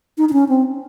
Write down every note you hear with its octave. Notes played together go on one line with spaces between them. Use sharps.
D#4
D#4
C#4
C4